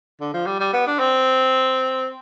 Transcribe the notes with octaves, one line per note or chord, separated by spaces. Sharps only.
D3
F3
G3
G3
B3
D4
C4